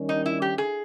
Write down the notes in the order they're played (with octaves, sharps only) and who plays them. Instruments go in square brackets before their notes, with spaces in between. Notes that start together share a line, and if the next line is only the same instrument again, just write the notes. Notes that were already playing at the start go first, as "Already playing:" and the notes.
Already playing: [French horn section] D#3 G3 C#4
[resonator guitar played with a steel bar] D#4
E4
G4
G#4